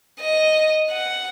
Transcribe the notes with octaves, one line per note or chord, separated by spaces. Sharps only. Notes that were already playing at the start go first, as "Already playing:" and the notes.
D#5
F#5